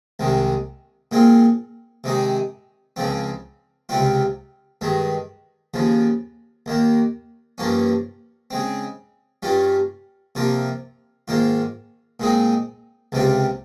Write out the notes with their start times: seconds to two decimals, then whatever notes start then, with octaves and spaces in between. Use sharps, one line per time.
0.19 C2 C3 D#3 G#3
1.11 A#2 G#3 C4 F4
2.04 C3 D#3 G#3 D#4
2.96 C#2 C#3 F3 C4
3.89 C#2 C3 G3 C4 F4
4.81 G2 D#3 G#3
5.74 D#2 C#3 F3
6.66 D#2 D#3 A#3
7.58 G2 F3 A#3 C#4
8.51 C#3 G#3 C4
9.43 G2 G3 C#4 F4
10.35 C3 F3 A#3 F4
11.28 G#2 D#3 A#3 F4
12.20 A#2 G#3 C4 D#4
13.12 C#2 C3 G3 C4 F4